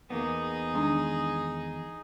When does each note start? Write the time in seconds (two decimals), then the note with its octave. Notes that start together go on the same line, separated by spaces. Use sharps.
0.10 E2 A#3 B3 D#4 G#4
0.75 E2 D#3 G#3 D4